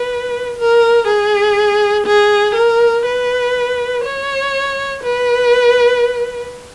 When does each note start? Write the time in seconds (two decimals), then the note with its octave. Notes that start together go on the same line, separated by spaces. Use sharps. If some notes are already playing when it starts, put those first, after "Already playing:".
Already playing: B4
0.59 A#4
1.08 G#4
2.07 G#4
2.56 A#4
3.06 B4
4.05 C#5
5.04 B4